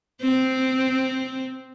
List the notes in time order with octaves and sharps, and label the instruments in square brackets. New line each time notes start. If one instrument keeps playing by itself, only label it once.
[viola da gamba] C4